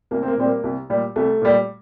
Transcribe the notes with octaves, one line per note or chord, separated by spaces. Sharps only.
C2 A#3
C4
A#3
A#2 G3 C4
A#3
C2
A#2 G3
C2 A3
A#2 G3